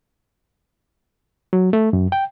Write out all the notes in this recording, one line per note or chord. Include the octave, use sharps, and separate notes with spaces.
F#3
A3
F#2
G5